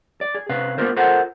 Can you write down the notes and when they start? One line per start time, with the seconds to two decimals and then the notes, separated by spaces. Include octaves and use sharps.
0.21 D5
0.35 G#4
0.49 C3 C#4 B4 F5
0.78 A#3 B3 D#4 F4 A#4 C5
0.96 F4 A4 A#4 C5 F#5